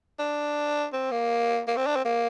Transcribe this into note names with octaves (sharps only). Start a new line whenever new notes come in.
D4
C4
A#3
A#3
C4
D4
C4
A#3